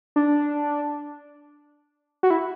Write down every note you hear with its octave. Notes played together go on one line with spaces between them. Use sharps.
D4
F#4
E4